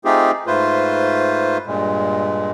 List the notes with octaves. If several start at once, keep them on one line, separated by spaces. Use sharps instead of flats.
A3 C4 D#4 F4 G4 G#4
G#2 A3 F4 B4 C5
G2 A#2 G#3